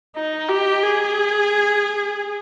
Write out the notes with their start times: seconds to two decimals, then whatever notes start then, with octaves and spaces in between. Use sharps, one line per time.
0.16 D#4
0.49 G4
0.83 G#4